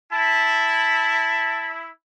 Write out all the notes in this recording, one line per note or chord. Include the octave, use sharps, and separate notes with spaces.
E4 A5